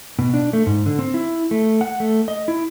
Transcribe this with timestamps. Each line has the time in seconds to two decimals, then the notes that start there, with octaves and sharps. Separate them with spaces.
0.19 B2
0.34 D4
0.53 A3
0.66 G#2
0.86 D3
0.99 C4
1.14 E4
1.51 A3
1.81 F#5
2.00 A3
2.28 D#5
2.48 E4